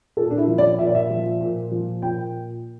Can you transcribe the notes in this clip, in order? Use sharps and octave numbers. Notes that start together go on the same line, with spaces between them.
A#2 A4
D4
E4
F3
D5
A#2 E5
D5
E5
F3
A#2
F3
A#2 G5